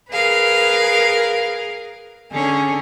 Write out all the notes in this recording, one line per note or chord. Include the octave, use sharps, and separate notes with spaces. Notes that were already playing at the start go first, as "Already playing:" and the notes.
G#4 A#4 B4 F5
D3 C#4 G#4